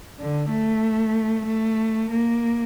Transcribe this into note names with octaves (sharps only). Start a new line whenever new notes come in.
D3
A3
A3
A#3